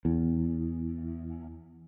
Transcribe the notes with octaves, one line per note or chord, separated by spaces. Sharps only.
E2